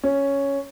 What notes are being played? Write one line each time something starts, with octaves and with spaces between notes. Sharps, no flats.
C#4